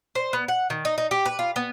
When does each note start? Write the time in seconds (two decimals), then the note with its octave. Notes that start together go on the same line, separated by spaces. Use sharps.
0.15 C5
0.33 B3
0.48 F#5
0.70 D#3
0.85 D#4
0.98 D#4
1.11 G4
1.26 B4
1.39 F4
1.56 B3